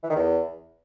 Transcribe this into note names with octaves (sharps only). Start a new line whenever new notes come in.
E3
D#3
E2